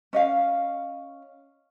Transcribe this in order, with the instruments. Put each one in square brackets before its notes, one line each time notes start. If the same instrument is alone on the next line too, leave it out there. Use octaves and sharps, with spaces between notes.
[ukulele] C#4 D#5 F5